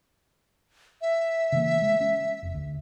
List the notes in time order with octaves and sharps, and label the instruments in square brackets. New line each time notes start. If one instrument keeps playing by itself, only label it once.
[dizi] E5
[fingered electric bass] C#3 E3 A#3
G#3
C#4
F1
D2